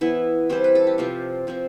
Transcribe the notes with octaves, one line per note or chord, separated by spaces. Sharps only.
E3 B3 E4
E3 G3 C4 C5
B4
A4
G4
C3 F3 C4 F4
C3 F3 C4